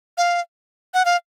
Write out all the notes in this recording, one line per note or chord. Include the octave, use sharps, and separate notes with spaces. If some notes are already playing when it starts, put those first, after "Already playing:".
F5
F#5
F5